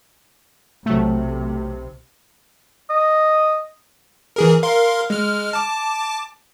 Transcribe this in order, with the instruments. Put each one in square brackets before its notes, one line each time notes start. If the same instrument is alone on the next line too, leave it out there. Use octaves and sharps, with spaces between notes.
[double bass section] B1 C3 [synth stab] F#3 A3
[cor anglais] D#5
[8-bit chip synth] E3 G#4 A#4
A#4 F5 C6
G#3 F6
A5 D6